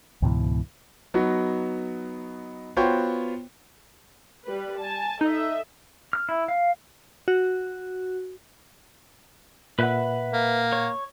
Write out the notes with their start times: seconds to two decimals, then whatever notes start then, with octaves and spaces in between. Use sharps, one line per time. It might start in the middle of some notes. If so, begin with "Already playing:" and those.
0.22 C#2 G#2 B2 E3
1.14 F#3 B3 D#4 F#4
2.77 B3 F4 F#4 C5 C#5 G5
4.46 G3 B4
4.78 G#5 A5
5.21 D#4 A4 D#5 E5
6.13 F6
6.29 E4
6.48 F5
7.28 F#4
9.79 A#2 B4 E5 F#5 F#6
10.33 A#3
10.73 C#5